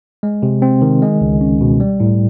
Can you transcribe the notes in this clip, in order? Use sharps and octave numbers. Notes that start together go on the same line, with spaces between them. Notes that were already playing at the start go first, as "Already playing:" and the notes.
G#3
C3
C4
D#3
G#3
C#2
C#4
B2
G3
A2